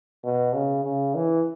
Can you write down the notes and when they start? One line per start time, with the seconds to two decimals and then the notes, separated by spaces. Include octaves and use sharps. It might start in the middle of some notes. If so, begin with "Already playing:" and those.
0.24 B2
0.53 C#3
0.84 C#3
1.15 E3